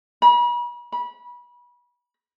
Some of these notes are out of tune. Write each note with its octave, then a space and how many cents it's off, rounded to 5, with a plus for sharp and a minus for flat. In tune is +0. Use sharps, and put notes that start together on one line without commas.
B5 -40
B5 -25